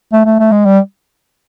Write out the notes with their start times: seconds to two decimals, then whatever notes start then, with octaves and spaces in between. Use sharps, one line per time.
0.13 A3
0.25 A3
0.39 A3
0.52 G#3
0.65 G3